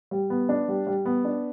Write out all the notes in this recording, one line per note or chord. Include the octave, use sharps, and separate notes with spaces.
G3
B3
D4
G3
G3
B3
D4